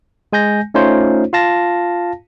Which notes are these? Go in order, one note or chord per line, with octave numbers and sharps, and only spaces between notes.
G#3 G#5 G6 A#6
A3 C#4 D#4 F4 C5 C#5
F4 F5 A5 A#6